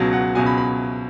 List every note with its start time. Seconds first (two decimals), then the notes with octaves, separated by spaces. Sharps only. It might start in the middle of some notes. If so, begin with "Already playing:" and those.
Already playing: C#2 B2 F#3
0.13 F#5
0.35 C#2 B2 F#3 G#5
0.46 B5
0.58 B5